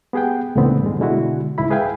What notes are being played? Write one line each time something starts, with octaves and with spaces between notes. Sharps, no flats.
B3 G4 G#4 F#5 G5
C#2 A2 D3 E3 B3 C4
G2 D3 G#3
B2 D3 G#3 E4 F#4
C#2 G#2 E4 B5
G#4 B4 E5 F5 G5 G#5